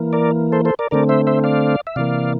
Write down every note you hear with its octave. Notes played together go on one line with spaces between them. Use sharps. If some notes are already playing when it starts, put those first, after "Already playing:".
Already playing: E3 A#3
A#4 D5
A4 C5
A4 C5
A#4 D5
D3 A3 C4 A#4 D5
C5 E5
C5 E5
D5 F5
E5
C3 E3 A#3 D5 F5